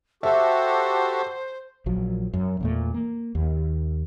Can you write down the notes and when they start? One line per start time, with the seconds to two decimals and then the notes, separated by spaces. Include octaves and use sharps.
0.23 F#4 G4 A4 C5 E5
1.86 A#1 F3 F#3
2.33 F#2
2.60 E2 A#2 A3
2.94 A#3
3.35 D#2